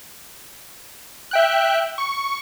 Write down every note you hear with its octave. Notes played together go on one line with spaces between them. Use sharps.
E5 G5 F#6
C#6